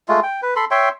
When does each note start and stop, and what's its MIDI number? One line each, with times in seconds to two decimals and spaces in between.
0.08 0.20 56
0.08 0.20 57
0.08 0.20 65
0.23 0.41 79
0.42 0.54 71
0.56 0.65 69
0.56 0.65 83
0.56 0.65 84
0.71 0.89 73
0.71 0.89 76
0.71 0.89 79
0.71 0.89 84